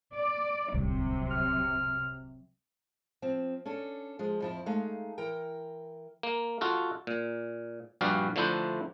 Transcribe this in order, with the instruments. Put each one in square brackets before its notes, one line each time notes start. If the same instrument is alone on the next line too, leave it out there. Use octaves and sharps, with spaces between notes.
[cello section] D5
[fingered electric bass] D1 C2 [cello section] C3 F#3
[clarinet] F6
[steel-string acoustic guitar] F3 C4
C#4 D4 A4
F3 G#3
F2 F3 E4
G#3 A3 D#4 F5
E3 A#4 G5
[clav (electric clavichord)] A#3
F4 F#4 A4
A#2
A#1 G2 G3 F#4 D5 F5
D3 F3 A3 D4 E4 C5